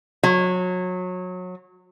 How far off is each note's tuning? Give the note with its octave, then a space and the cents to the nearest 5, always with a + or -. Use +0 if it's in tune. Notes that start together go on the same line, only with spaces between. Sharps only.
F#3 -25